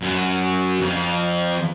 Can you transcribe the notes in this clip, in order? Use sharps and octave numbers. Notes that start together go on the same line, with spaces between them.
F#2
F2